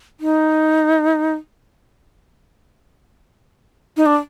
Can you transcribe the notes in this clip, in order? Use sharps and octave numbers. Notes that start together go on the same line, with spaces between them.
D#4
D#4
D4